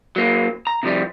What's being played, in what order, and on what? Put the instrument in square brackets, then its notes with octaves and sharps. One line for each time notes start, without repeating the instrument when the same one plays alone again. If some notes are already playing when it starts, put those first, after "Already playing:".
[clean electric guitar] F#3 A#3
A#5
C3 F3 G3